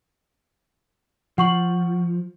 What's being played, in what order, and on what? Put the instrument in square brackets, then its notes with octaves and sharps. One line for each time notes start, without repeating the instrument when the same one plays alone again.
[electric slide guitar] F3 [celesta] F#5 C#6 F#7